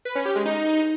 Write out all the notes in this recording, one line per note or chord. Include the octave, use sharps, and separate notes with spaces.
B4
C#4
G4
G#3
D#4